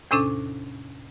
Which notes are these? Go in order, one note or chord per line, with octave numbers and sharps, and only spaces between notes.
E2 A2 C3 C#4 D4 A4